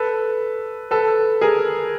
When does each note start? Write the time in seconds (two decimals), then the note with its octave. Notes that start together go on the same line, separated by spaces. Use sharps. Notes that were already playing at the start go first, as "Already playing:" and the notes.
Already playing: A4 B4
0.91 A4 B4
1.41 G#4 A#4